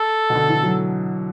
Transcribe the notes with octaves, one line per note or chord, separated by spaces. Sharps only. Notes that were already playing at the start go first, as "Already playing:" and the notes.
Already playing: A4
B2
D3
E3
F#3